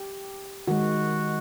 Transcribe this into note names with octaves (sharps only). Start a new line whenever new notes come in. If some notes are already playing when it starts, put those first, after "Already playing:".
Already playing: G4
D#3 G#3 F#4